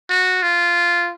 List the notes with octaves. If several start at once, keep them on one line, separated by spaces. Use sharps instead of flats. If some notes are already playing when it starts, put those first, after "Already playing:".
F#4
F4